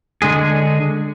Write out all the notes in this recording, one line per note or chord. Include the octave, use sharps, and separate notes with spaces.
D3 G#3 G#4